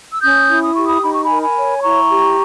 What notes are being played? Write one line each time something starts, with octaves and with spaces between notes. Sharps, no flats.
E6
C#4 D#6 G6
E4
D#6
G4 C#6
B5 D#6
D#4 B5
C#6
A#4 G#5 B5
G#5 B5
C#5
B5
E4 A#5 C#6
G4